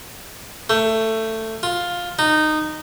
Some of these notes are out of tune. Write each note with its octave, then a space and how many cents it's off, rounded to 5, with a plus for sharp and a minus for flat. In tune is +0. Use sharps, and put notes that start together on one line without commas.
A3 +15
F4 +10
D#4 -15